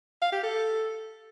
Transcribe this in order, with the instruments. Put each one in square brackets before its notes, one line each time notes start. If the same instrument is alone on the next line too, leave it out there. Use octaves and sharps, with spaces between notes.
[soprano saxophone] F5
G4
A4